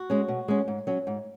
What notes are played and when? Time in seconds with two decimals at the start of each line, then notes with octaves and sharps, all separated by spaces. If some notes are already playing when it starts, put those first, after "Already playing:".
Already playing: F#4
0.10 G#3 C#4
0.28 B2
0.48 G#3 C#4
0.68 G#2
0.87 F#3 C#4
1.07 G#2